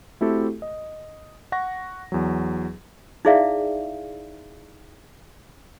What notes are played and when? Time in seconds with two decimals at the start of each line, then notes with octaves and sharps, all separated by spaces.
0.21 A3 C4 E4 F#4 G4 A4
0.62 D#5
1.52 F#5 C#6 A#6
2.12 E2 F#3
3.25 D#4 E4 G#4 D5 E5 F5